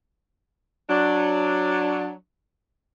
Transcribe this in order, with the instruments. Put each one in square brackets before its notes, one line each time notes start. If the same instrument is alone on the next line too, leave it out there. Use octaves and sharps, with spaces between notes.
[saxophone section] F#3 D4